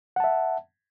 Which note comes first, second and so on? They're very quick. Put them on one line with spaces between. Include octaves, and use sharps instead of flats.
F#5 A5 E5